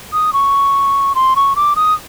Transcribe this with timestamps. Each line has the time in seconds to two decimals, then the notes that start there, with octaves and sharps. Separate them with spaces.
0.13 D#6
0.33 C#6
1.15 C6
1.36 C#6
1.56 D6
1.76 D#6